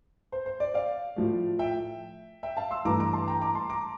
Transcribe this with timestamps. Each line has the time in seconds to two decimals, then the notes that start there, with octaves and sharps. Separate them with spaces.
0.32 C5
0.46 C5
0.60 D5
0.74 D5 F5
1.16 A2 F3 A3
1.59 E5 G5
2.43 E5 G5
2.57 F5 A5
2.71 C6 E6
2.85 G2 E3 A3 A#5 D6
3.00 A#5 D6
3.13 A5 C6
3.28 G5 A#5
3.41 A#5 D6
3.55 A5 C6
3.69 A#5 D6